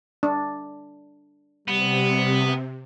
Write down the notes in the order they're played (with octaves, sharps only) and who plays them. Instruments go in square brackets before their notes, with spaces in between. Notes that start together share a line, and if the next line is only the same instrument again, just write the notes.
[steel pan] D4
[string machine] C3 [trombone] G3 [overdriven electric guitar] B3